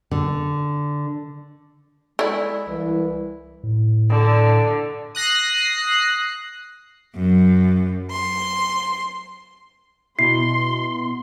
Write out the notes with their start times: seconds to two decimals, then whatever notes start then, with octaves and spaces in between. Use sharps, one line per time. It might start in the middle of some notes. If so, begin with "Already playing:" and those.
0.11 D3
2.19 G#3 E4 A4 C#5 D5
2.68 C2 E3
3.64 A2
4.10 D3
5.15 D#6 F#6 A#6 C7
7.16 F#2
8.10 C6
10.19 B2 E4 C6 C7